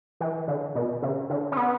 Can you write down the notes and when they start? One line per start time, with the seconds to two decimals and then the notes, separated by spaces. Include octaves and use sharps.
0.21 E3
0.48 D3
0.75 B2
1.02 C#3
1.30 D3
1.52 C#4
1.57 B3